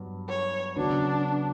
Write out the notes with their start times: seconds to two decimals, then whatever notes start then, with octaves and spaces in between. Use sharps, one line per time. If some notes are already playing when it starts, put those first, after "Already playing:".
Already playing: G2 F#3 B3
0.29 C#5
0.76 C#3 F#3 B3 D4 F#4